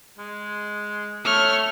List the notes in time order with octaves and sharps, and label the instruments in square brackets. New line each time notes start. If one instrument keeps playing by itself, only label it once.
[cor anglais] G#3
[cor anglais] A3 [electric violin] C#5 F6